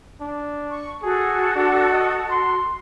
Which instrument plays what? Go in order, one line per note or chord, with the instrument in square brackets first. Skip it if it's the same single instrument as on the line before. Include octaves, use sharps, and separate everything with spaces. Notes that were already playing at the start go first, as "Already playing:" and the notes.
[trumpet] D4
[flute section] C#6
[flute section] F#4 A4 [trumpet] G#4
[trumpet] D4
D#5
C6